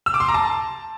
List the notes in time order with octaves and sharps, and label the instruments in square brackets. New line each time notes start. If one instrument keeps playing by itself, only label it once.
[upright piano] E6
D6
C6
A#5
A5